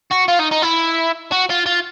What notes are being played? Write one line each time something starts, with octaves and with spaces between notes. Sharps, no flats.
F#4
F4
D#4
D#4
E4
F#4
F4
F4